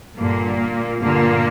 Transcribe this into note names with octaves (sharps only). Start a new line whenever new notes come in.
G2 A#2 D3 A#3
G2 A#2 D3 A#3